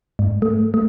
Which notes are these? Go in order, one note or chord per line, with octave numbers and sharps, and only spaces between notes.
G#2
A3
A3